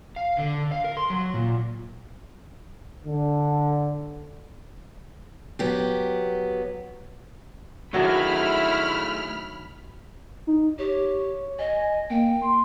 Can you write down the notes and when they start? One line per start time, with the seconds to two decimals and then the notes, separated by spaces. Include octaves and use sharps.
0.16 F5
0.38 D3
0.72 F5
0.84 A#4
0.97 C6
1.10 F#3
1.34 A#2
3.06 D3
5.59 F#3 B3 G4
7.93 D#3 F#3 A3 D4 E4 G#4 B5 F6
10.47 D#4
10.79 G4 C#5
11.59 D#5 G#5
12.10 A#3 G5
12.42 C6